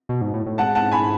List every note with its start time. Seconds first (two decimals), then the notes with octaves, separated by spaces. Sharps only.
0.09 B2
0.21 G#2
0.34 A2
0.46 A2
0.58 G#2 F#5 A5
0.75 F#5 A5
0.92 G#5 B5